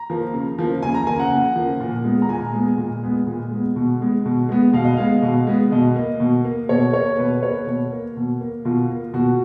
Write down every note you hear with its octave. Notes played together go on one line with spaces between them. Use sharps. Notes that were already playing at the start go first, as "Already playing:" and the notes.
Already playing: A#5
F3 A#3
C#3
F3 A#3
C#3 G#5
A#5
F3 A#3 G#5
F#5
C#3
F3 A#3
A#2
G#3 B3
A#5
A#2 G#5
G#3 B3
A#2
G#3 B3
A#2
G#3 B3
B2
G#3 B3
B2
G#3 B3
B2 F5
D#5
G#3 B3 F5
B2
G#3 B3
B2 D#5
A#3
B2
A#3
B2 C#5
A#3 C#5
B2 B4
A#3 C#5
B2
A#3
B2
A#3
B2 F4
A#3
B2 F#4